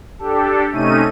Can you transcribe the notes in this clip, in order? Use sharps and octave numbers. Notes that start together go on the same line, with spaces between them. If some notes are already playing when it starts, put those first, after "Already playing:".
D4 G4 A4
C3 A3 C#4 D#4 D#7